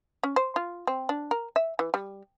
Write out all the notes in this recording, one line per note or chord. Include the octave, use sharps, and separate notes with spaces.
C#4
C5
F4
C4
D4
A#4
E5
E3
G3